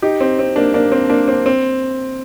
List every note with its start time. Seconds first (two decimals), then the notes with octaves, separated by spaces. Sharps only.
0.02 D#4 G4
0.21 C4
0.39 C4
0.56 A#3 D4
0.74 A#3 D4
0.92 C4
1.09 A#3 D4
1.28 C4
1.46 C4